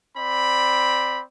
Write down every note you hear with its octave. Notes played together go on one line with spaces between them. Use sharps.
C4 D5 B5